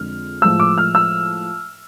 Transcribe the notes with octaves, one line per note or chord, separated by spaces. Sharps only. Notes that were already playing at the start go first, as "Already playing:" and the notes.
Already playing: F2 D3 G#3 F6
A2 F3 G#3 E6
D6
F6
E6